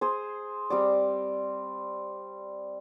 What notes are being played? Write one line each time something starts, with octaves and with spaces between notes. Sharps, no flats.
G#4 C5
G3 C4 D5